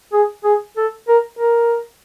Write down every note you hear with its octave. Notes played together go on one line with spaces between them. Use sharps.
G#4
G#4
A4
A#4
A#4